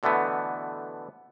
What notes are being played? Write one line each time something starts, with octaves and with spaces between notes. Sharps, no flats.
B2 D3 E3 A3 B3